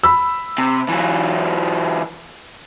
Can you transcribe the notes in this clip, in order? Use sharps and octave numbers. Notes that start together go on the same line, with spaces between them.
B5 E6
C3
E3 F#3